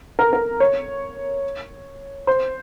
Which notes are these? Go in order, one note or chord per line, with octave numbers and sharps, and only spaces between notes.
A#4
A#4
C#5
C5